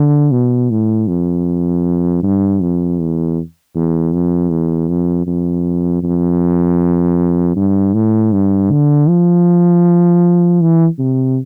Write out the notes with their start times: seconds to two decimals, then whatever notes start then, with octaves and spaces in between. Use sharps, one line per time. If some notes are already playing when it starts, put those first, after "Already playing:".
Already playing: D3
0.31 B2
0.71 A2
1.08 F2
2.22 G2
2.61 F2
2.99 E2
3.75 E2
4.13 F2
4.51 E2
4.89 F2
5.27 F2
6.03 F2
7.56 G2
7.94 A2
8.32 G2
8.70 D3
9.09 F3
10.61 E3
10.98 C3